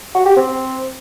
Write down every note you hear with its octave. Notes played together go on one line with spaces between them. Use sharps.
F#4
G4
C4